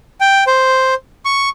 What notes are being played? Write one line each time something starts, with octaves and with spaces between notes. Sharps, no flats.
G5
C5
C#6